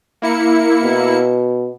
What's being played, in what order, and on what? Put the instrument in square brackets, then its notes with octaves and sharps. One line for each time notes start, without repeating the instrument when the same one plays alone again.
[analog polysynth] A#3 E4 C#7
[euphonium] B2